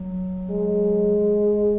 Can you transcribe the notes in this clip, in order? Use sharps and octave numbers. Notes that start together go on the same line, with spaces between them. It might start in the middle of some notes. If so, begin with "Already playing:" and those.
Already playing: F#3
G#3